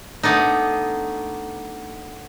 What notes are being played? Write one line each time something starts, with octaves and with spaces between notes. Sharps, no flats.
A3 B3 D4 D#4